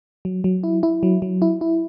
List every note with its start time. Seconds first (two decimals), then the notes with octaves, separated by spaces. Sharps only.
0.25 F#3
0.44 F#3
0.63 E4
0.83 E4
1.03 F#3
1.22 F#3
1.42 E4
1.61 E4